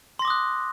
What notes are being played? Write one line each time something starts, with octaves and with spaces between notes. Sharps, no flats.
C6 D6 D#6 F#6 A#6